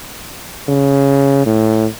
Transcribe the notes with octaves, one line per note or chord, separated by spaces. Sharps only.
C#3
A2